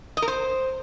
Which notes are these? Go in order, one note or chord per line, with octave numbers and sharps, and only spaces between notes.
D#5
A#4
C5